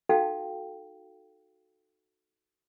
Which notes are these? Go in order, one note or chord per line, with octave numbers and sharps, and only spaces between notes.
D#4 F#4 A4 F5 G5 A5